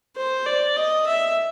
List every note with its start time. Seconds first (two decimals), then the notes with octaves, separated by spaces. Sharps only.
0.16 C5
0.46 D5
0.76 D#5
1.07 E5